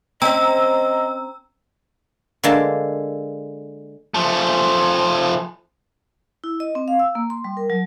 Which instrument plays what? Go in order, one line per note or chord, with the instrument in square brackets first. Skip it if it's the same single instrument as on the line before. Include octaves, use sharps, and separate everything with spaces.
[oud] C4 C#4 [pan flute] D#5 [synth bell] A#5 E6
[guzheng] D3 G#3 A#3 A5
[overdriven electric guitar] F3 A3
[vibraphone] E4
D#5
C4
F5
E6
A#3
C6
G3
A#4
F#3